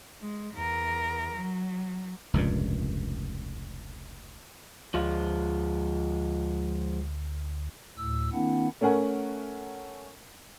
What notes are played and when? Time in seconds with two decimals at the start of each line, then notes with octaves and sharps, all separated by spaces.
0.21 G#3
0.54 E2 A#4
1.35 F#3
2.34 F1 C#2 G2 A#2
4.94 D2 F3 G#3 F4
7.97 D2 A2 E6
8.33 D#3 A#3 C4 D4 E4 F#5
8.81 A3 C#4 A#4 F#5 G#5